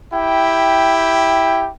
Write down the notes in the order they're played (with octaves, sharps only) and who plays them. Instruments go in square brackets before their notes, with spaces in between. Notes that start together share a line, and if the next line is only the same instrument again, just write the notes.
[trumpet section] E4 G4 G5